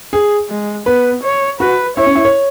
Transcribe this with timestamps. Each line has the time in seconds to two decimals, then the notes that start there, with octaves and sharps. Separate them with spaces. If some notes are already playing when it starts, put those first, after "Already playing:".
0.13 G#4
0.49 G#3
0.86 B3 B4
1.23 C#5
1.60 F#4 B4
1.97 E4 C#5
2.06 C#4
2.15 E4
2.25 C#5